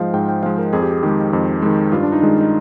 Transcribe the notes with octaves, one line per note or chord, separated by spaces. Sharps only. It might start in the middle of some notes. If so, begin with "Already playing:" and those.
Already playing: G#2 F3 G#3 D#5 F5 G5
G#2 G5
G5
F3 G#3 F5
A#4
F2 G#4
G4
G#4
D#3 G#3 G4
F2
D#3 G#3
G2 F4
D4
D#4
D#3 G#3
D#4